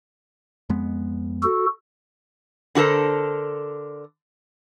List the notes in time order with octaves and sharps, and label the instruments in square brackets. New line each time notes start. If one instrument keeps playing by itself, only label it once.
[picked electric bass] F2 G#3 B3
[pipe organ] F#4 A4
[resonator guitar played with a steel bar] D3 F#4 A4 A#4 C5